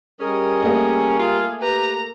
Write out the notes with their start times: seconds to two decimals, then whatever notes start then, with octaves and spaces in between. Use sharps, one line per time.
0.21 G3 C#4 G#4 A#4 D#5
0.63 A3 A#3
1.19 F4 G#4
1.61 G4 B4 A#5